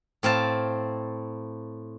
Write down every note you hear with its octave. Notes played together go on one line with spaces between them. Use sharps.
A2 C4 F5 A5